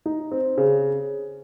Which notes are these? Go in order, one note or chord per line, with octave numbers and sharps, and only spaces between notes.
D#4
C4
C#3